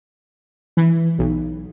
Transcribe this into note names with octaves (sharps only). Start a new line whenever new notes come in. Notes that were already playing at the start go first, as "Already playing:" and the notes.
E3
B1